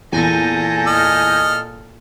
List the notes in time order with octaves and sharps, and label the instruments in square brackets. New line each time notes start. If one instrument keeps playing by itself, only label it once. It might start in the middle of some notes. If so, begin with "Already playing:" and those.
[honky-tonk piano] E2 [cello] A#2 A4 [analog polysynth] G#5 G6 A#6
[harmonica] D#5 F6